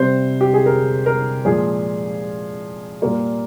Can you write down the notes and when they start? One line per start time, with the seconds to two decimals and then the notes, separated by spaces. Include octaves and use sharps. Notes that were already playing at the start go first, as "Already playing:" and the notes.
Already playing: C3 G3 C5
0.41 G4
0.54 G#4
0.66 A#4
1.06 A#4
1.45 A#2 F3 G#3 G#4
3.01 A#2 G3 A#3